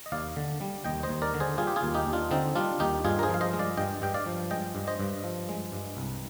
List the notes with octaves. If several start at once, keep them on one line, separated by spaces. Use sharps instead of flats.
D#5
D#2 D5 F5
D3
G3
D#2 D#5 G5
C5 D#5
D#2
A#4 D5
D3
G#4 C5
G3 F4 G#4
G4
F4 G#4
D#2
D#4 G4
D#2
D4 F4
D3 C4 D#4
G3 D4 F4
D#2 D#4 G4
G2 F4 G#4
A#4
G#4 C5
F3 F5
C5 D#5
G#3
D5 F5
G2 D#5 G5
G2 G5
D5 F5
F3
G#3 D#5 G5
G2
C5 D#5
G2
F3
G#3
G2
C2